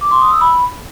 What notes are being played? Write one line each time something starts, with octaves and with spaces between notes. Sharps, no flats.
D6
C6
D#6
E6
B5